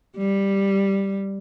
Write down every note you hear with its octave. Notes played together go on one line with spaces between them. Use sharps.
G3